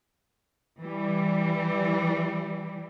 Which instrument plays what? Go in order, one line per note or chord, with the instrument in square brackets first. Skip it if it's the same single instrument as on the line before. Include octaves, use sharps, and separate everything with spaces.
[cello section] E3 G3